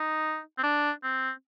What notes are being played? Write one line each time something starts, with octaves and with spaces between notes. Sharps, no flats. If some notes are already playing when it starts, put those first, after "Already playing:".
Already playing: D#4
C4
D4
C4